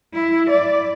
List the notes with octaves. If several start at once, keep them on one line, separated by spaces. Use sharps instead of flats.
E4
D5